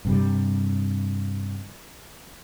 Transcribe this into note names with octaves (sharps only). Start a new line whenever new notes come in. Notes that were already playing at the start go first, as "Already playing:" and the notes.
G2 C3 G3